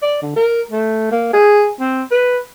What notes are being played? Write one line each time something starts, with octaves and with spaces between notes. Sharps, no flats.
D5
D3
A#4
A3
A#3
G#4
C4
B4